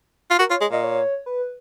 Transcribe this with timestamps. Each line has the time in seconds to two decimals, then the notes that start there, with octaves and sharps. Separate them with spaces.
0.31 F4
0.39 F#4 A#4
0.50 F4 C#5
0.61 G#3
0.71 A#2 D#5
0.84 C#5
1.26 B4